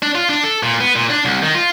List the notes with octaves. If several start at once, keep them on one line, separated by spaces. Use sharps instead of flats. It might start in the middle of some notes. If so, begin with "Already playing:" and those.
D4
F4
D4
A4
A#2
B3
A#2
D4
C2
D#3
F4